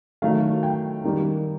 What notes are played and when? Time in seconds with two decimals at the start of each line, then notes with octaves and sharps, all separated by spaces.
0.22 D#3 F#3 A3 F5
0.63 G5
1.04 D#3 G3 A#3